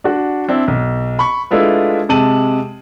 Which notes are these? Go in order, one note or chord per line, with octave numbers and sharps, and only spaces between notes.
D4 F#4
C4 D4 E4
B1
B5 C#6
G#3 A3 D4 E4 F4 B4
C3 G#3 A5 D#7 F#7